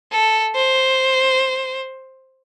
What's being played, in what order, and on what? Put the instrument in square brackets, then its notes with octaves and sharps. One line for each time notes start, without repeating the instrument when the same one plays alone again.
[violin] A4
C5